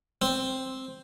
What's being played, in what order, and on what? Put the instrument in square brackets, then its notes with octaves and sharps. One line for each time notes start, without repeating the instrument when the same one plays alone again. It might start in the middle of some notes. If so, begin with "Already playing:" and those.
[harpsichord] C4